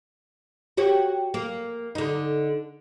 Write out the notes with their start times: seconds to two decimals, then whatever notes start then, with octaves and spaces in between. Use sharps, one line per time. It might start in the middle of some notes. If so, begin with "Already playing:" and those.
0.77 F#4 G4 C#5
1.34 A#3
1.95 D3 D#4